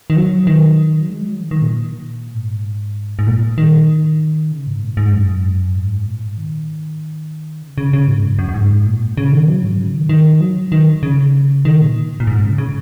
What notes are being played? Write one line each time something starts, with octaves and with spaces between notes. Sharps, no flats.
D#3
F#3
D#3
F#3
G#3
F#3
D#3
D#3
A#2
G#2
G#2
A#2
D#3
C#3
G#2
A#2
G#2
F#2
G#2
A#2
G#2
D#3
C#3
C#3
C#3
G#2
F#2
F#2
F#2
G#2
A#2
C#3
D#3
F#3
G#2
C#3
D#3
D#3
F#3
D#3
C#3
D#3
A#2
A#2
G#2
C#3
C#3